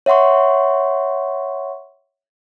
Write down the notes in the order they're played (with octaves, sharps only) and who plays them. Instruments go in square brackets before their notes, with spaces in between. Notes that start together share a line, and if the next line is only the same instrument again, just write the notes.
[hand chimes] C#5 E5 F#5 C6 C#6